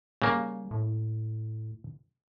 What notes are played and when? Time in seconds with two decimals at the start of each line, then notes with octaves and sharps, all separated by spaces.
0.22 C#3 G3 A#3
0.71 A2